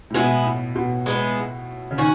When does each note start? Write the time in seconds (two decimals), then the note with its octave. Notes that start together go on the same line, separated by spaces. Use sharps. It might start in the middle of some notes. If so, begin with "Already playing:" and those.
0.10 A2
0.14 B2 G#3 B3 E4
0.45 A2
0.76 B2
1.06 G#3 B3 E4
1.91 C#3
1.98 D#3 C#4 F#4